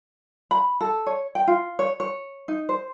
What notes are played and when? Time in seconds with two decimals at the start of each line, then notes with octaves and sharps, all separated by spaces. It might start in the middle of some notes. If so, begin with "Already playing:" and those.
0.51 B5
0.81 A4
1.06 C#5
1.35 G5
1.47 F4
1.79 C#5
2.00 C#5
2.48 D#4
2.69 C5